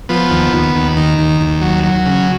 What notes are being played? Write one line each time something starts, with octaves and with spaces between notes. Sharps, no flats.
F3 B3
D#2
D#2
D#2
D#3
D#2
D#2
F#3
F#3
C#3